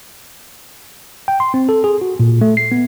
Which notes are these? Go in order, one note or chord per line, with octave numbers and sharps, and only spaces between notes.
G5
C6
C4
A4
G#4
F#4
A#2
A3
C7
B3